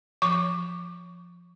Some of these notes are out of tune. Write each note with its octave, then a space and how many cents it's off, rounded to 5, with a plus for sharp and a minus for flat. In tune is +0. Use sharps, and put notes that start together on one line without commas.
F3 +0 C#6 +30